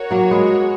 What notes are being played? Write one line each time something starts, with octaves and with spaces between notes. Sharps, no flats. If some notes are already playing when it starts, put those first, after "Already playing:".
Already playing: F#4 A#4 C#5
F#3 A#3
G#3 B3